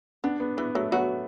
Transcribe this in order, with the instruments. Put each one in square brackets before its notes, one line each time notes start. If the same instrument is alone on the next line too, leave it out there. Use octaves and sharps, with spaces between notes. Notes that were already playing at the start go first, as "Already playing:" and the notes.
[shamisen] B3 [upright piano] D4
[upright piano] B3
[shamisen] E3 [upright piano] B3
[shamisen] F#3 [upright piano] A3
[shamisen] F#3 F#4 [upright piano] B3